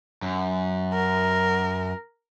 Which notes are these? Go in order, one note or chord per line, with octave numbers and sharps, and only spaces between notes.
F#2
A#4